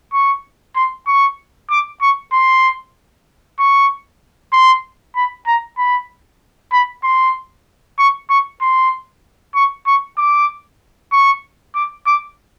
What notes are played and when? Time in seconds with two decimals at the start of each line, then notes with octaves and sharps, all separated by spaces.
0.13 C#6
0.76 C6
1.07 C#6
1.70 D6
2.01 C#6
2.32 C6
3.59 C#6
4.53 C6
5.16 B5
5.47 A#5
5.78 B5
6.73 B5
7.04 C6
7.98 C#6
8.30 C#6
8.62 C6
9.55 C#6
9.87 C#6
10.18 D6
11.12 C#6
11.75 D6
12.06 D6